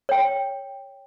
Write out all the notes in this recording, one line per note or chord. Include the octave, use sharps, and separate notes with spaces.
C#5 G5